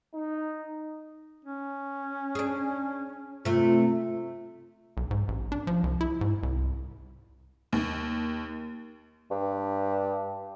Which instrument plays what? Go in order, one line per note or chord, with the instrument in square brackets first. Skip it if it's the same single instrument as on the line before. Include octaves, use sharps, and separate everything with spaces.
[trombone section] D#4
[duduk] C#4
[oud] D4 G#4
[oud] C3 A3 [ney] F4
[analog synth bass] B1
G#2
A1
D4
F3
C2
E4
G#2
C2
[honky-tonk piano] D#2
[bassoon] G2